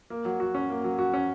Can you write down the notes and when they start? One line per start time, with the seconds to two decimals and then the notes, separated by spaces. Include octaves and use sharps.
0.10 A#3
0.25 F#3
0.40 F#4
0.55 C#4
0.70 A#3
0.84 F#3
0.99 F#4
1.14 C#4